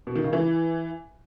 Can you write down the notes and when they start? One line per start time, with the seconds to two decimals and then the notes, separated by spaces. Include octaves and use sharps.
0.07 B2
0.15 D#3
0.24 C#3
0.33 E3